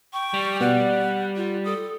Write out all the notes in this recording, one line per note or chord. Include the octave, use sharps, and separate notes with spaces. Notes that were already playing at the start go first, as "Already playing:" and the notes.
G5 C#6
G3
B2 B3 D5 F#5
F4
A4 D#6